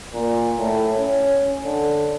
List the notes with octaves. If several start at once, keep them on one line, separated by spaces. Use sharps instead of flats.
A#2
A2
C#4
D3